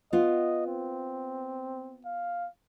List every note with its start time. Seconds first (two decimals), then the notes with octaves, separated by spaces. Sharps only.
0.13 B3 F4 D#5
0.67 C4
2.05 F5